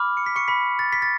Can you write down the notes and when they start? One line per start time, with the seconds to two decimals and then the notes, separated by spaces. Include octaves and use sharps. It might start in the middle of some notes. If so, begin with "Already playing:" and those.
Already playing: B5 D6 F6
0.17 C#7
0.26 B6
0.36 C#6 C#7
0.48 B5 B6
0.79 A6
0.92 B6
1.02 A6